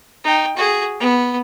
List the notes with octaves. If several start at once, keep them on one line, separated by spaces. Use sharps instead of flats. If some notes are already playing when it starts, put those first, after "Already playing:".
D#4 G5
F#4 G#4
B3